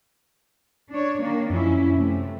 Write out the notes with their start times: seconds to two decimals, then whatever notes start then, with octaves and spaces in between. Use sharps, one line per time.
0.91 D4 C#5
1.21 D#3 A#3 D4
1.50 F#2 F3 C#4 E4
1.96 C3 A3